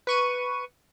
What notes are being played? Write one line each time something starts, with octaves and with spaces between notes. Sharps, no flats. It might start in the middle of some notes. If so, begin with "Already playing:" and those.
B4 C#6 D#7